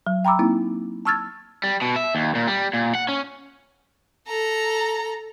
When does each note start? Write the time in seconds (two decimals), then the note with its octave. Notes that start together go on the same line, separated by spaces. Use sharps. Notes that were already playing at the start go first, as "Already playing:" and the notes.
0.07 F#3
0.25 G5 A#5 B5 D6 E6
0.39 A#3 C4 D#4 E4
1.05 A5 C#6 E6 F6 G#6 A6
1.64 G3
1.82 B2
1.96 E5
2.15 D#2
2.35 A#2
2.48 G3
2.73 A#2
2.95 F#5
3.09 C#4
4.28 A4 A#5